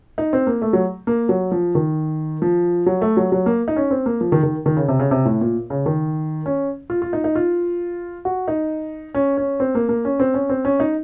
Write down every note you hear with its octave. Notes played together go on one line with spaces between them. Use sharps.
D#4
C4
A#3
A3
F#3
A#3
F#3
F3
D#3
F3
F#3
A3
F#3
F#3
A#3
D#4
C#4
C4
A#3
F3
D#3
D#3
D#3
C#3
C3
C#3
C3
A2
A#2
C#3
D#3
C#4
F4
F4
D#4
D#4
F4
F#4
D#4
C#4
C#4
C4
A#3
A#3
C#4
C4
C#4
C4
C#4
D#4